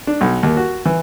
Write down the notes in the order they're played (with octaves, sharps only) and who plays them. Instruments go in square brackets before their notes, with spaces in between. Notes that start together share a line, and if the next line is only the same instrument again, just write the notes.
[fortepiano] D4
B1
D#2
F#4
E3